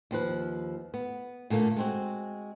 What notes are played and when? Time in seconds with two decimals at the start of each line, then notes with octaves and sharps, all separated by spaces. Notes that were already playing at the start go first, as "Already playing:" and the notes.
0.11 D#2 F3 B4
0.94 B3
1.50 A#2 D3 A3 A#3
1.76 G#3 C4 F#4